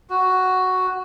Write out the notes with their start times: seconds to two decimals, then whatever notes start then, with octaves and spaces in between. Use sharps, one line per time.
0.10 F#4